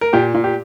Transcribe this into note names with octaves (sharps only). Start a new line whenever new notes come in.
A#4
A#2 G4
A#2
G4